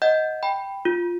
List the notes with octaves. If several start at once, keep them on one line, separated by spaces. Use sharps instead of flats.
D#5 F#5 G6
G5 B5
F4